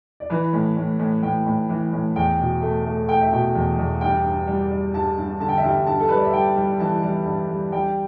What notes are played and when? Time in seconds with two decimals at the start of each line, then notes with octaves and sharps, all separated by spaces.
0.20 D5
0.30 E3 B4
0.53 A2
0.77 A2
0.99 A2
1.23 A2 G5
1.46 A2
1.69 E3
1.92 A2
2.16 E2 G5
2.39 B2
2.62 A3
2.85 A3
3.09 A3 G5
3.21 E5
3.32 B2 G5
3.55 E2
3.78 E2
4.01 G2 G5
4.24 G2
4.47 G3
4.71 G3
4.94 G2 A5
5.17 G2
5.40 D3 A5
5.49 G5
5.57 E5
5.63 G2 G5
5.87 G2 A5
6.00 A4
6.09 G3 B4
6.16 D5
6.25 E5
6.33 G3 G5
6.56 G3
6.79 E3 A5
7.03 G3
7.26 G2
7.49 G3
7.72 G3 G5